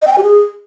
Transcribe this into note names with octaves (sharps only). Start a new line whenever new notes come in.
D#5
G5
G#5
G4
G#4